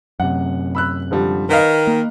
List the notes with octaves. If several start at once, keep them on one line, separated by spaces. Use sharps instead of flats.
F#2 C3 F#5
B5 E6 F#6
D3 F3 G3
D#3 A#4 B4 D#5 F5
A#3